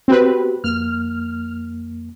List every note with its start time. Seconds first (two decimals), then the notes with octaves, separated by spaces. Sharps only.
0.08 B3 C4 F#4 G4 B4
0.64 F2 A#3 F6